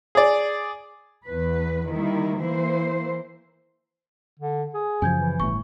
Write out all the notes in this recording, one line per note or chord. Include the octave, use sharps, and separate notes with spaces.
G#4 D5
E2 B4
D#3 G3 A#3 E4
E3 A#3 E4 C5
D3
G#4
F#2 C#3 F3 G#5 G6 G#6
E3
G1 A2 C#6